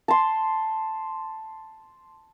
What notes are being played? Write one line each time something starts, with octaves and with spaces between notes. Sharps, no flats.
A5 C6